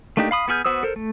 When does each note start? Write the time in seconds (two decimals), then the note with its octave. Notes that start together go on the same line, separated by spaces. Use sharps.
0.17 A3 A#3 D4 D#4 G4
0.31 F5 B5 D#6
0.48 B3 F#4 G#4 F6 G6
0.65 B3 F#4 C5 D#6 E6
0.83 A4 A#4 C5
0.96 A3